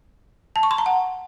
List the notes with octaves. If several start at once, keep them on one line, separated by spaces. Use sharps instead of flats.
A5
C#6
C6
A#5
F#5